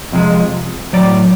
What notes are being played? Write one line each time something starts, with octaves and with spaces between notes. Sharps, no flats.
F2 C3 F3 G#3
A2 F#3 D5